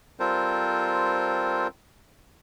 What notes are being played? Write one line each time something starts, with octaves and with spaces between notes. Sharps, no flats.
G3 C4 F4 A4 A#4 C5